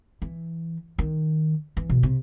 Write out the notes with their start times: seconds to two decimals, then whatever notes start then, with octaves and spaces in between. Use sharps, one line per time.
0.22 E3
0.99 D#3
1.77 E3
1.90 B2
2.03 C3